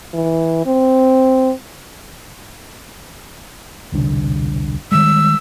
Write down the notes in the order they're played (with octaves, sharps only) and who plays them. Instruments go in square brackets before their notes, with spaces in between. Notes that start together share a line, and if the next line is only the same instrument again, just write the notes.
[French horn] E3
C4
[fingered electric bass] E1 C2 D3
[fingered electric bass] D#3 G3 G#3 [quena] E6